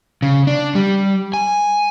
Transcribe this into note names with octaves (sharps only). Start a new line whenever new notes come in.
C#3
D4
G3
G#5